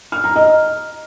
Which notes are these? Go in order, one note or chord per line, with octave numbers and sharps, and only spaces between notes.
F6
A#5
D#5